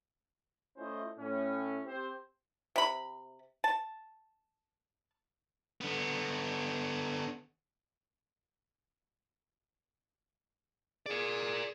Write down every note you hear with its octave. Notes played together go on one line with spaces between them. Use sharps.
A3 C#4 E4 F4 C5 D#5
A2 C#4
C4 G4 C5
C3 B5
A5
D3 B3
G#4 A#4 D5